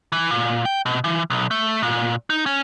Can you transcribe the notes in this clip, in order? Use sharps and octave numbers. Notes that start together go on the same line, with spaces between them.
E3
A#2
G5
B2
E3
B1
A3
A#2
D#4
C#4